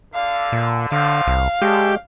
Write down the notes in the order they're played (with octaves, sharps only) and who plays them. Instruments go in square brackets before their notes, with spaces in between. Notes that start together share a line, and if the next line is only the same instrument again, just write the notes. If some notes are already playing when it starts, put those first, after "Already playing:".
[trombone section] D3 [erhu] F5
[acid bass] A#2
[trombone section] A2 F3 [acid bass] D3 [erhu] F5
[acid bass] C2
[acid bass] G#3 [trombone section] C#4 D4 A4 [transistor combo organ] G4